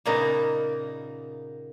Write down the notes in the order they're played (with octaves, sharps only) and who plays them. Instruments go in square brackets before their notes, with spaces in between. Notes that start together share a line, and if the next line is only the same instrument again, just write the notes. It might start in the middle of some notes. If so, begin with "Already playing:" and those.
[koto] A#2 C#3 A#3 B3 D#4